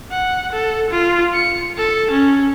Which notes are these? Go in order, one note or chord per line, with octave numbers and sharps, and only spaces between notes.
F#5
A4
F4
C#7
A4
C#4